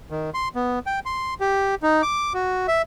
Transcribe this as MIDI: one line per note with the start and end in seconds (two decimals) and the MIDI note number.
0.11 0.30 51
0.34 0.48 84
0.55 0.79 59
0.86 1.00 79
1.06 1.34 84
1.41 1.75 67
1.83 2.02 63
2.02 2.33 86
2.34 2.67 66
2.68 2.82 76